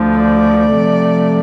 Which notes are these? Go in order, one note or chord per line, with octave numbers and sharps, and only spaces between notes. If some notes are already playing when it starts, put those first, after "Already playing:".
Already playing: D2 D3 F3
D5
C3 F3 A3